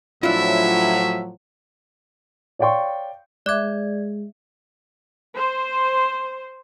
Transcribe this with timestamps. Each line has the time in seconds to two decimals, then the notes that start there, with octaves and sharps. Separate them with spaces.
0.23 A2 F3 F#3 D4 E4 F4 E5
2.59 C#5 D5 F5 G5 C6 C#6
3.46 G#3 D5 E5 D6 F#6 G#6
5.35 C5